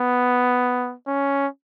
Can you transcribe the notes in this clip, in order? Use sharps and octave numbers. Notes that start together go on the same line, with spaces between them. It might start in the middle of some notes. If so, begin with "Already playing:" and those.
Already playing: B3
C#4